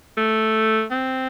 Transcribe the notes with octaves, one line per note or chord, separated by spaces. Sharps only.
A3
C4